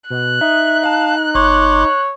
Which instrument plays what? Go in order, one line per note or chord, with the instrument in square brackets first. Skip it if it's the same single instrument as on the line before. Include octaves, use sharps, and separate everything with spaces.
[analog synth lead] B2 [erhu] F#6
[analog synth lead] D#4 [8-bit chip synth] E5
[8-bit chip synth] F5 A5
[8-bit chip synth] G1 C6 D6 [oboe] C#5